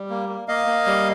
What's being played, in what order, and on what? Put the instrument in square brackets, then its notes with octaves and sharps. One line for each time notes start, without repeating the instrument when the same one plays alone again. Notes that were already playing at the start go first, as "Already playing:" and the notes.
Already playing: [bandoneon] G3
A#3
A#3
A#3 D#5 F5
A#3
G3